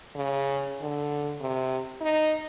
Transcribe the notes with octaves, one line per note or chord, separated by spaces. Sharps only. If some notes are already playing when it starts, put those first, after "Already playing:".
C#3
D3
C3
D#4